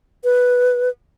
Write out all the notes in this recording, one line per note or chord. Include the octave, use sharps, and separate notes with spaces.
B4